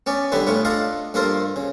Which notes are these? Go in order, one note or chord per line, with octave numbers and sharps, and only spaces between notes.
B3 C#4 D5
D3 G3 B3 E4 B4
A2 B3 F4 C#6
D4 F4 A4 D#5 F5
G2 A#3 F4 A4 A#4 C5
C#3